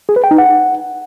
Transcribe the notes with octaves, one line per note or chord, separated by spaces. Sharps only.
G#4
B4
G5
D#4
F#5